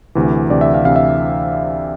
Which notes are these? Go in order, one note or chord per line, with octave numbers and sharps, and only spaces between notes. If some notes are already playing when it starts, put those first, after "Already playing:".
D2 C3 E3
D2 C3 E3 D5
E5
F5
D2 C3 E3 F5
E5